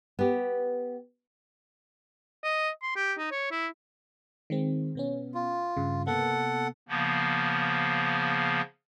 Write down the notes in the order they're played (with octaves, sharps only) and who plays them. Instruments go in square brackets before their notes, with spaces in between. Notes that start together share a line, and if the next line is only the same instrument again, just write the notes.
[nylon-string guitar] B3 G4
[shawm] D#5
C6
G4
D#4
C#5
E4
[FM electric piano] D#3 G#3 C4
B2 B3 C#4
[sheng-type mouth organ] F4
[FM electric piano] G2 C#3
[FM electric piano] C3 A#3 B3 [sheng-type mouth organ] A4 F#5
[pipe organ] C#3 F3 A#3 B3